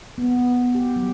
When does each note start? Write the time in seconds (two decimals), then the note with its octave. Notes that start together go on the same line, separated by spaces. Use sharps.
0.18 B3
0.75 G4
0.96 F#3